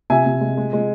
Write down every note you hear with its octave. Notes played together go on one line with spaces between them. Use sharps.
C3 E5 G#5
C3
G#3
G#3
G#3